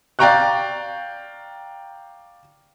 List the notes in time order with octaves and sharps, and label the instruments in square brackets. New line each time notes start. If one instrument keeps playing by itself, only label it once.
[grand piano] D5 F5 G5 A#5 C#6 F#6